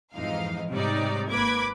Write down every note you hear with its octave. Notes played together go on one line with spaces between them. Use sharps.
F2 G#2 E3 D#4 F5
G#2 C3 G3 D#4 C#5 D5
G#1 A#3 B4 B5 D6 G#6